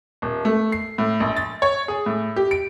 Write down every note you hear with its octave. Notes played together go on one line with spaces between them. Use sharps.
D#1
A3
C7
A2
A#1
A6
C#5
G#4
A2
G4
D7